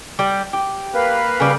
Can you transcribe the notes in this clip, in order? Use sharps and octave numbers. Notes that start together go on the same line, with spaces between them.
G3
G4
A#3 B4 F5
C#3 G3